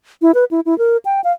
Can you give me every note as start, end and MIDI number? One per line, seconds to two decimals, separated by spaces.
0.22 0.32 64
0.35 0.45 71
0.51 0.60 64
0.66 0.77 64
0.78 0.97 70
1.05 1.21 79
1.24 1.32 77